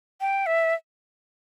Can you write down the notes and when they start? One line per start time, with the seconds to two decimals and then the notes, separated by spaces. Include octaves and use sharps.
0.21 G5
0.46 E5